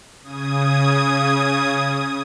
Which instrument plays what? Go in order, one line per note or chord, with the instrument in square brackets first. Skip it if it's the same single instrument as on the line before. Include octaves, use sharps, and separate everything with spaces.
[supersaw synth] C#3 D#6 G#6